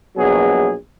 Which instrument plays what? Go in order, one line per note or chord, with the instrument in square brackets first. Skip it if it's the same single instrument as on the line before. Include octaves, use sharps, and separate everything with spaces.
[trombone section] A#1 B2 F#3 G#4